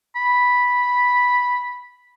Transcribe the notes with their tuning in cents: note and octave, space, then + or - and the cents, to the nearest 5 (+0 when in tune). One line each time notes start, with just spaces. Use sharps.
B5 -5